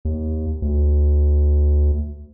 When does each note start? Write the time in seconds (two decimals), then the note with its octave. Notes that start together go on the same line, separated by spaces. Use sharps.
0.05 D#2
0.62 D2